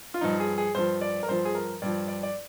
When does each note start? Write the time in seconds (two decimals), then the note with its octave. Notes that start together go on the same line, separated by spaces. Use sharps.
0.14 F4
0.21 G2 F3 D#4
0.40 G#4
0.58 G#4
0.75 G2 F3 C5
1.01 D5
1.23 A#4
1.28 G2 F3 C5
1.45 G#4
1.55 A#4
1.82 G2 F3 D5
2.08 D5
2.23 D5